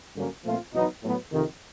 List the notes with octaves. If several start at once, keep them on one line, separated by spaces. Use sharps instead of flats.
G2 D3 F#3 A#3 C#4
A#2 F3 A3 C4 F4
E2 B2 F#3 B3 D#4
A2 F#3 B3
F2 C3 D#3